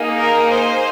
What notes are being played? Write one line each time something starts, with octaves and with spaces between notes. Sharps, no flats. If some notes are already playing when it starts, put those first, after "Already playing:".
Already playing: A#3 D#4 G#4
A#4
C5